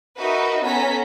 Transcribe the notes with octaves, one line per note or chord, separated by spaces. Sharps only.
D#4 F#4 A#4 B4 D#5 E5
B3 C#4 A4 G#5 A#5 B6